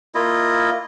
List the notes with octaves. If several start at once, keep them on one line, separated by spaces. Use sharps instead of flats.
A#3 E4 F4 D#5